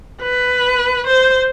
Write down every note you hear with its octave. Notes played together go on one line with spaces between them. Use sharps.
B4
C5